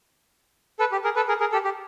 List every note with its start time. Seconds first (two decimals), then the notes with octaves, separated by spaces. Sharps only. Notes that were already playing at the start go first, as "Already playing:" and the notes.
0.79 A4 B4
0.92 G4
1.04 G#4 A#4
1.16 A4 B4
1.28 G#4 A#4
1.40 G#4 A#4
1.52 G4 A4
1.64 G4